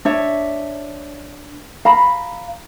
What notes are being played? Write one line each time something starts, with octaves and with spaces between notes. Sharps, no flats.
D4 C#5 E5
F5 A#5 B5